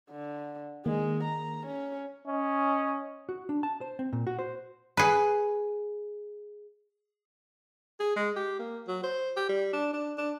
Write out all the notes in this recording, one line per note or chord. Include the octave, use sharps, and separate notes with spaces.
D3
D#3 G#3 A#3
A#5
C#4
C#4 D#5
F#4
D4
A5
C5
C4
A#2
F#4
C5
G#4 B4
G#4
G#3
G4
A#3
F#3
C5
G4
G3
D4
D4
D4